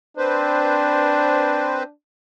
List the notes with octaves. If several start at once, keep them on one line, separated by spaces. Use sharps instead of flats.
C4 D4 B4 C5